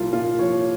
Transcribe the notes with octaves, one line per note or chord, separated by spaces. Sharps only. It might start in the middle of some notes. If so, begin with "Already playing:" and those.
Already playing: C2 A#2 F3 A#3 F4
A#2 F4
F3 C#5